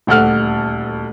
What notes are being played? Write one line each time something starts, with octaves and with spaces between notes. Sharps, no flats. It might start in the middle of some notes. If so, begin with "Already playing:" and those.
D#1 D2 A4 F#5 F6